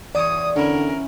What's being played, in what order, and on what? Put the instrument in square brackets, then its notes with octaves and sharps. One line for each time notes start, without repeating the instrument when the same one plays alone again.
[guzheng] E2 C#5 [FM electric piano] D5 [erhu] D#6
[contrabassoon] D3 [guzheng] C#4 E4 [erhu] A#4